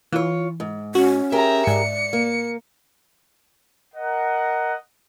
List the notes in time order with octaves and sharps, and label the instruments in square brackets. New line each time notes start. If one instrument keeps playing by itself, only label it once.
[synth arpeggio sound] E3 [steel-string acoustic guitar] F4 C#5
[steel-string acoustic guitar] G#2
[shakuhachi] C#4 [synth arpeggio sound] F#4
[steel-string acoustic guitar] G4 G#4 A#4 [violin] E5 A#5
[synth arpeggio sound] G#2 [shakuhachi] D5 [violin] C#7
[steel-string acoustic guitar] A#3
[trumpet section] A#4 D#5 F#5